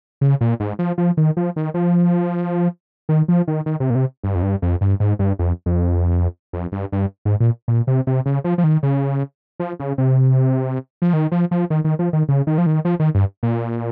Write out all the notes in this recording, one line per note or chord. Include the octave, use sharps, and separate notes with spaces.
C#3
A#2
G#2
F3
F3
D#3
F3
D#3
F3
D#3
F3
D#3
D#3
C3
A#2
C3
G2
F2
G2
F2
G2
G#2
G2
F2
F2
F2
G2
G2
G#2
A#2
A#2
C3
C3
C#3
F3
F3
D#3
C#3
F3
C#3
C3
F3
D#3
F3
F3
D#3
D#3
F3
D#3
C#3
D#3
F3
D#3
F3
D#3
G2
A#2